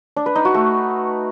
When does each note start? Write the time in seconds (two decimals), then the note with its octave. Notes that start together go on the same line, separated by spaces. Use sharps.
0.16 D4
0.26 B4
0.35 D#4
0.45 F#4
0.54 A3